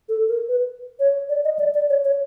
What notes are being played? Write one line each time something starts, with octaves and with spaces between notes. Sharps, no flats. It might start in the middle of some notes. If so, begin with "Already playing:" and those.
A4
A#4
B4
C#5
D5
D#5
D5
D5
C#5
C#5